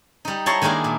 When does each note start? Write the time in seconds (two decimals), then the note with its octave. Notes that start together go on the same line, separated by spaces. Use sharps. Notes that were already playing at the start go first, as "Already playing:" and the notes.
0.25 G3 D#4
0.46 E4 C#5 A5 A#5 C6
0.61 D#3 G#3 A#3 D4 E4
0.84 A#2